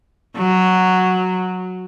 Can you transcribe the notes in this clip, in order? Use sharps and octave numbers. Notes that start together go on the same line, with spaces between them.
F#3